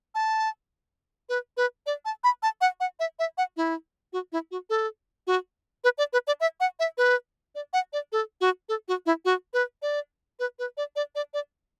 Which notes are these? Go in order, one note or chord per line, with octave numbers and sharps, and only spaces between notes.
A5
B4
B4
D5
A5
B5
A5
F#5
F#5
E5
E5
F#5
E4
F#4
E4
F#4
A4
F#4
B4
D5
B4
D5
E5
F#5
E5
B4
D5
F#5
D5
A4
F#4
A4
F#4
E4
F#4
B4
D5
B4
B4
D5
D5
D5
D5